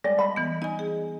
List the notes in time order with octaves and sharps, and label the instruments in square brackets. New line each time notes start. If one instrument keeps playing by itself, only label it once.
[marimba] G3 G#3 [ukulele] D5
[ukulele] D#5 B5
[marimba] E3 B3
[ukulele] D#4 [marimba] D#5 G#5
[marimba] G#4